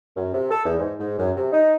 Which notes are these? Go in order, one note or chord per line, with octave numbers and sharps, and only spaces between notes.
F#2
C3
A4
E2
G#2
G#2
F#2
C3
D#4